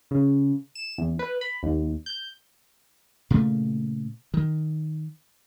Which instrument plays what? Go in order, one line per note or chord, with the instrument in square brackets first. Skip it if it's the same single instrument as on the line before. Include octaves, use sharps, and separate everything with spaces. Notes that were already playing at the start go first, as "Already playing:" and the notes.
[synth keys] C#3
E7
E2
B4
B5
D#2
G6
[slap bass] A#2 C#3 A3
D#3